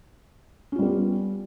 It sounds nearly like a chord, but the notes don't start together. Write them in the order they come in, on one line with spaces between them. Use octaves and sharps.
C#4 F4 G3 B3 G4